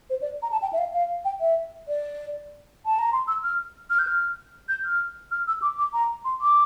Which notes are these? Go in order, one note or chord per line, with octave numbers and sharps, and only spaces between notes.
C5
D5
A#5
A5
G5
E5
F5
F5
G5
E5
D5
A5
A#5
C6
E6
F6
F6
G6
F6
G6
F6
F6
E6
D6
D6
A#5
C6
D6